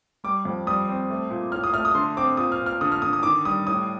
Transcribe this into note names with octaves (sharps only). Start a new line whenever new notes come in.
G3 D6
F2
G3 D#6
C4
A3
A#2
A2 F6
D#6
A3 F6
D#6
D3 C6
C4 D6
A#2 D#6
F6
A#2
F6
D3 D#6
F6
D3 D#6
D#6
D#3 D6
G3 D#6
A2 D#6